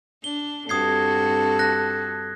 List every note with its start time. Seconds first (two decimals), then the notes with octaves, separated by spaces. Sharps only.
0.24 D4 G7
0.69 G2 C4 F#4 A4 D#6 G#6 C7
1.59 F#6 A#6